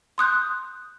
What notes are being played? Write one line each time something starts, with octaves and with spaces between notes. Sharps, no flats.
C6 D#6 F#6 G6